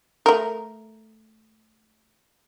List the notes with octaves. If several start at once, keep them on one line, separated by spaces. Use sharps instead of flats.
A3 A#4